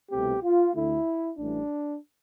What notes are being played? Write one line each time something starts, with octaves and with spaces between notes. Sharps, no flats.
C2 B2 A3 C4 G4
F4
D2 D3 A3 E4
A1 A2 E3 G3 D4